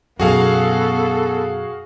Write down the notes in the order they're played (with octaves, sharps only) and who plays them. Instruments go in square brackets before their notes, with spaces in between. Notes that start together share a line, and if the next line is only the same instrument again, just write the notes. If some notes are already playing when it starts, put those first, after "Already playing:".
[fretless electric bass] F#2 B2 [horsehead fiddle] B3 A4 [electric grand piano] F#4 G#4 F5